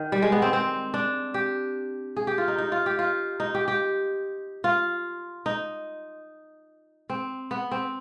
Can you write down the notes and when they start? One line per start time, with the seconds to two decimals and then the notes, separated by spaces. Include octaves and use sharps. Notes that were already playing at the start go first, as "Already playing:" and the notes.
Already playing: D#3
0.12 G3
0.22 G#3
0.32 B3
0.42 C4
0.53 C4
0.94 D4
1.34 G4
2.17 G#4
2.27 G4
2.38 F4
2.48 D#4
2.58 D#4
2.72 F4
2.86 G4
2.99 F4
3.40 D#4
3.55 G4
3.68 G4
4.64 F4
5.46 D#4
7.10 C4
7.51 B3
7.71 C4